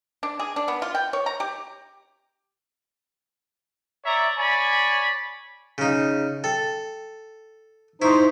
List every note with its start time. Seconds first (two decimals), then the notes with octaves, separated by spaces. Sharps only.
0.23 D4
0.39 G#4
0.56 D4
0.68 B3
0.82 F4
0.95 G5
1.13 C#5
1.26 A#5
1.40 G4
4.05 C#5 D5 E5 A#5
4.37 C#5 D5 G#5 B5
5.78 C#3 D#4 F5
6.44 A4 G5
8.02 D#4 E4 C5 A#5 C6 C#6